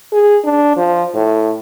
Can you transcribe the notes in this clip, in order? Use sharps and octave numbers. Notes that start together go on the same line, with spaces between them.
G#4
D4
F3
A2